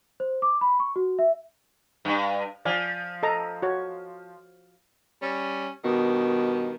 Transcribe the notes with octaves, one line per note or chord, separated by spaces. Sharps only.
C5
D6
B5
C#6
F#4
E5
G2
F3 D5 F5 G#5
A4 D#5 A#5
F#4 C#5
G3 C#4
G2 B2 D#3